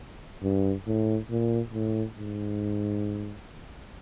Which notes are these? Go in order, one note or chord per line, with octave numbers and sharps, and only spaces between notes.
G2
A2
A#2
A2
G#2